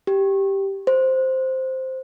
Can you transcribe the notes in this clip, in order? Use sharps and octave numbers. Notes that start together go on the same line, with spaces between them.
G4
C5